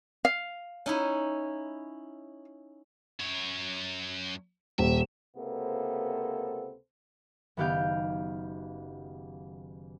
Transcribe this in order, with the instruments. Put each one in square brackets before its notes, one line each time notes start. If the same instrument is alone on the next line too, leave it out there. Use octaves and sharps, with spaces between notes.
[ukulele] F5
[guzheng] C#4 D#4 E4
[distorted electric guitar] F#2 C#5
[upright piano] D#1 [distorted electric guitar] E5
[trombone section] C#2 C3 A#3 B3 A4 C5
[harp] F#1 D#3 B3 G4 F5 G6